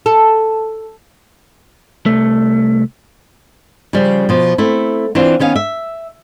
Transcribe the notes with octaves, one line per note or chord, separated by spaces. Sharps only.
A4
C2 A3
C#3 F3 G3
B2 F3
A3 C4 E4
E3 C4 D4 E4 F4
D#3 B3 C#4 F5
E5